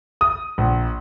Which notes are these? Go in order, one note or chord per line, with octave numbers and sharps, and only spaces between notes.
D#6
A#1